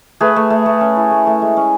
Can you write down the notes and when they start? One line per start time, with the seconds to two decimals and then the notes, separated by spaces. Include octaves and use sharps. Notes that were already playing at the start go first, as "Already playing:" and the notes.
0.20 A3 G#4 B4
0.36 A3
0.50 A3
0.66 A3
0.81 C#4
0.96 E4
1.12 A3
1.27 A3
1.42 G#3
1.57 C#4